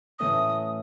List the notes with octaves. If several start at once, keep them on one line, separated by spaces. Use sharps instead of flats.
A2 E3 A3 C#4 D#6